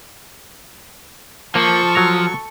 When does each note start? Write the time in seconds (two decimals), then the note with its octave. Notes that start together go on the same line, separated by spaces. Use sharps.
1.55 F3 A#3 A4 C#6
1.95 F#3 A#5